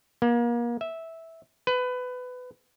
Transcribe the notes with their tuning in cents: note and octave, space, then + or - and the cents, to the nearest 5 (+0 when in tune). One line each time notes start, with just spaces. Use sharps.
A#3 +35
E5 -10
B4 +20